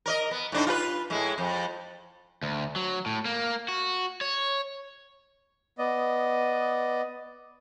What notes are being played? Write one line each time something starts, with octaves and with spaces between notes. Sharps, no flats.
A#4 D5 D#5
B3
A2 D4 D#4
F4 G4 B4
A2 G#3 E4
F2
D2
F#3
A2
A#3
F#4
C#5
B3 D5 D#5